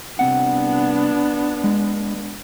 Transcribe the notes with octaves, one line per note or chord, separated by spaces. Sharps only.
C2 B3 C4 D4 F#5
G#3